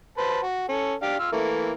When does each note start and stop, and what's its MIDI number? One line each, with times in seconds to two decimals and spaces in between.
0.18 0.40 71
0.18 0.40 72
0.18 0.40 81
0.43 0.68 66
0.68 0.94 61
0.68 0.94 69
1.02 1.19 62
1.02 1.19 67
1.02 1.19 77
1.19 1.31 65
1.19 1.31 88
1.19 1.31 89
1.32 1.72 52
1.32 1.72 57
1.32 1.72 58